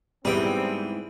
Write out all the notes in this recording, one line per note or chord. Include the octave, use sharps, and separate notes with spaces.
G#2 E3 G3 B3 C4 G#4 G5